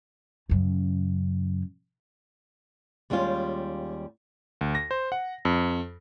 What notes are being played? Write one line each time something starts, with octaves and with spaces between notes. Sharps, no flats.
F#2 C#3
D#2 G3 G#3 C#4 F4
D2
A#6
C5
F#5
F2